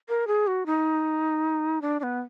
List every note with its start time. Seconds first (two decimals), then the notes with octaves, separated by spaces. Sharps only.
0.09 A#4
0.27 G#4
0.47 F#4
0.66 D#4
1.82 D4
2.00 D4
2.03 B3